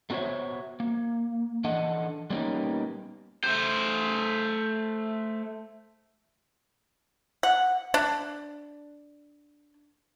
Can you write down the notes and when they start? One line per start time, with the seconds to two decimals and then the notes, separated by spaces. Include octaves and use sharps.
0.10 A3 B3 F#4 C5 C#5 E5
0.80 A#3
1.64 E3 D4 A4 D#5 F#5
2.30 G3 A#3 B3 C#4 D#4 G4
3.44 A3 C5
7.43 F#5
7.94 D4